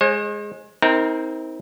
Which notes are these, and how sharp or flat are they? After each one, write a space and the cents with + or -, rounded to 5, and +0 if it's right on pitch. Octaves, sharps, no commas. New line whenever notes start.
G#3 +0 C5 +45
C4 +0 D#4 +40 A#4 +0